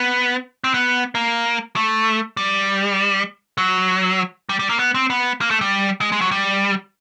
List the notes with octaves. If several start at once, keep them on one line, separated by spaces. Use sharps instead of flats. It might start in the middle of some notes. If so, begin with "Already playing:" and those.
Already playing: B3
C4
B3
A#3
A3
G3
F#3
G3
G3
A#3
B3
C4
B3
A#3
A3
G3
G#3
G#3
F#3
G3